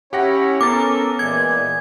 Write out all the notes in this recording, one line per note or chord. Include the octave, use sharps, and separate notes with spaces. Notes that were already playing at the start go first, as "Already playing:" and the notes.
C#4 E4 G4 C#5 F#5 A#6
B3 C#4 A4 A#4 D6 A6
A#2 E3 G#3 G#6